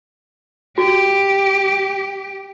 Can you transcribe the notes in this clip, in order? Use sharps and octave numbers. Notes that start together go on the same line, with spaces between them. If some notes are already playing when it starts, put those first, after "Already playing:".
F#4 G4